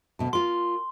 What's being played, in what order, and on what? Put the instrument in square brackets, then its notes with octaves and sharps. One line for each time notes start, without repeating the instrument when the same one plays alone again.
[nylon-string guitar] D2 B2 A5
[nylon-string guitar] F4 A#4 [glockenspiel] C6